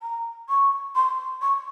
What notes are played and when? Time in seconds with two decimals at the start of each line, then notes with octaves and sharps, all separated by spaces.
0.02 A#5
0.49 C#6
0.95 C6
1.41 C#6